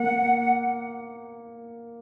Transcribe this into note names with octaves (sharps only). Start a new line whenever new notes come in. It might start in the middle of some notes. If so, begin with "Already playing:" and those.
Already playing: A#3 F#5